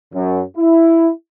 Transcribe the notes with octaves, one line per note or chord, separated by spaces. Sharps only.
F#2
E4